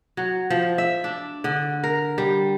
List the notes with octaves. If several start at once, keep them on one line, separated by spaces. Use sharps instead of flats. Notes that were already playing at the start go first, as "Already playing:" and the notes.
F#3
F3
E5
D4
D3
A#4
G3